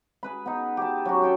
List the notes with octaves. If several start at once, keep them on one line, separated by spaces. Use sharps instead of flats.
G#4 B4 B5
B3 D#4
G4 A5
F#3 C#4 F#4
A4 G5 A5